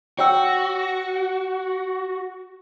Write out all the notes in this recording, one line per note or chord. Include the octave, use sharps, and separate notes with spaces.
F#4 C#5 G5 E6